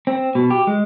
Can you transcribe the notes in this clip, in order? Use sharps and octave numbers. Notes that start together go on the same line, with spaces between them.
C4
B2
G4
G#3